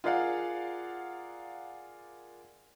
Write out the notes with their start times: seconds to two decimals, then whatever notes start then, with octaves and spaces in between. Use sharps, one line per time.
0.04 F4 G#4 A#4 D5 F5 F#5